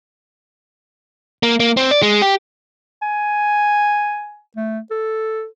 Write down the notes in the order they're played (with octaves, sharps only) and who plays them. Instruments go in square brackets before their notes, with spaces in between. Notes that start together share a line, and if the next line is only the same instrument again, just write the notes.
[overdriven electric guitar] A#3
A#3
C4
D5
G#3
G4
[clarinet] G#5
A3
A4